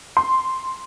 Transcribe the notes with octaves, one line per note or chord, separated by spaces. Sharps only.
C6